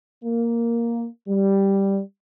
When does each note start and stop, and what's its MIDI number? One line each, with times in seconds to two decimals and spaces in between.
0.24 1.06 58
1.28 2.01 55